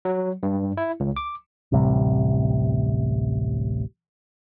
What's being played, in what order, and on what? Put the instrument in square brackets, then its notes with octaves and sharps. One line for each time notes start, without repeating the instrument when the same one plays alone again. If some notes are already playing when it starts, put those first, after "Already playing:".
[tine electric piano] F#3
G2
E4
C#2
D6
[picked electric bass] D1 A1 C3 G3